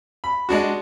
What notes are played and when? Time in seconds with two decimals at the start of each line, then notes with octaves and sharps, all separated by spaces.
0.24 B5
0.49 G#3 D4 F#4